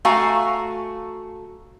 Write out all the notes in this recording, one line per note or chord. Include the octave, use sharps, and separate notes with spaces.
A3 F#4 F5 G#5 A#5